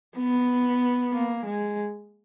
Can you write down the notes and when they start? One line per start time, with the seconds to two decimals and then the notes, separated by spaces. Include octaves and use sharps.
0.18 B3
1.13 A#3
1.45 G#3